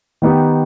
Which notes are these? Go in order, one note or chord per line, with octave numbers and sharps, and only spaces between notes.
D#3 B3 D#4 G4